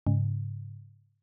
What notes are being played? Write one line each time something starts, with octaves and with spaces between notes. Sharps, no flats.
G#2 C#3